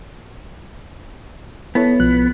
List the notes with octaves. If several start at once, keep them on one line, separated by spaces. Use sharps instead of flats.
B3 E4 A4 C#5
B1 F3 F#6